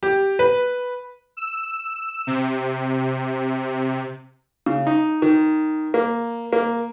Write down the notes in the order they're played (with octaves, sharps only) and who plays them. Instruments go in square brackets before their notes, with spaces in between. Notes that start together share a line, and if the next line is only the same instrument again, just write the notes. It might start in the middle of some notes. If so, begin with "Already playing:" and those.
[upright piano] G4
B4
[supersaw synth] E6
C3
[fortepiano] C#3
D#4
D#3
A#3
A#3